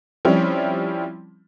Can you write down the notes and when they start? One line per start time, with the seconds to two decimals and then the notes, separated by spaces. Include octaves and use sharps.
0.25 F3 G3 C4 C#4 E4